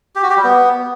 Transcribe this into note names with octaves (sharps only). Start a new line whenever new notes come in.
G4
F#4
G4
G3
B3